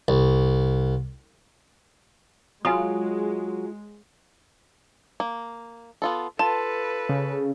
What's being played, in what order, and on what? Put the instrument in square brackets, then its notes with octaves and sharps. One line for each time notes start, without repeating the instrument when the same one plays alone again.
[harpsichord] C2
[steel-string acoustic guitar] F#3 [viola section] G#3 [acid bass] F4 [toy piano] G#5 B5 D#6
[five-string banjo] A#3
B3 F4 A4
[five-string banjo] F4 [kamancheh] A4 B4 [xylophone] A5
[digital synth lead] C#3